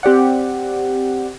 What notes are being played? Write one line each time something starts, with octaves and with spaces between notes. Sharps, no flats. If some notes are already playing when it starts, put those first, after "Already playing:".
C4 G4 D5 F#5